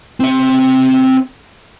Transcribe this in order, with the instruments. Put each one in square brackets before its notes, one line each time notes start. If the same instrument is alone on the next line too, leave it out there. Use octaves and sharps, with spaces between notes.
[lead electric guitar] C4 E5